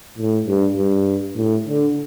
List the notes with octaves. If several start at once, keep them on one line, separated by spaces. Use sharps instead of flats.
A2
G2
G2
A2
D3